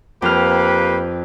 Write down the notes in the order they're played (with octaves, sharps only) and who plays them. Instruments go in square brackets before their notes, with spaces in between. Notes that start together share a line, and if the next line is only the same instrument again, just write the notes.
[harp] F2 F6 [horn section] A#3 G4 B4